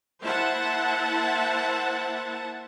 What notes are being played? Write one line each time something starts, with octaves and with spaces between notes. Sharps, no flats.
A#3 E4 C5 E5 F#5 A5